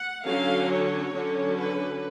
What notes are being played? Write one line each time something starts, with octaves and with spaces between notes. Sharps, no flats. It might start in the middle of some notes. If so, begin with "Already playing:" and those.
Already playing: F#5
D3 F#3 C#4 F5
C#5
D3 F#3 C#4
B4